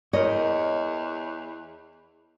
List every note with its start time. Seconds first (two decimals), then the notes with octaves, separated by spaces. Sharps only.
0.13 E2 A#4 C#5 D#5